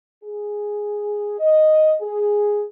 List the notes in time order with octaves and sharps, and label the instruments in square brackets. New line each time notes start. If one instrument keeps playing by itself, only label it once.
[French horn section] G#4
D#5
G#4